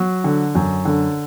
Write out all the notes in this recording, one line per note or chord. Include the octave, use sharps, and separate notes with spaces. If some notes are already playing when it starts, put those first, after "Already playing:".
Already playing: F#3
D3
F#2
D3